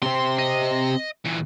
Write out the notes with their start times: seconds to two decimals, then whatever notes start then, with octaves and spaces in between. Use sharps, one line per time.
0.03 C3 C4 C6
0.39 D#5
1.25 A#2 E3